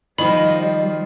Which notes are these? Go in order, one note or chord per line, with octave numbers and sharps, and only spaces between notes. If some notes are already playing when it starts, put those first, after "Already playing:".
D#3 F3 G3 D#5 B5